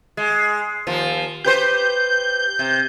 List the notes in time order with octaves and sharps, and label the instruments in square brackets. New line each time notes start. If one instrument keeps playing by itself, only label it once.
[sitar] G#3
D#2 F3
[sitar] G4 B4 C5 [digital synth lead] G6
[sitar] C3